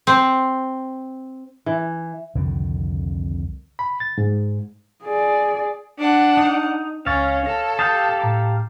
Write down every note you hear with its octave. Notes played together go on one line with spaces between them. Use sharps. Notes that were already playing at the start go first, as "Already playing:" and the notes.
C4
E3
C2 F2 D3 D#3
B5
A6
G#2
G#4 D5
D4 F#5
D#4
C#2 C#4 C#5 F5 A6
A4 A#6
G4 F5 A5 D#6 G6 A6
A2 A#5 D6